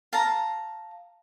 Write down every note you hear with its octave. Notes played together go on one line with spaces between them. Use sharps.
F5 A5 A#5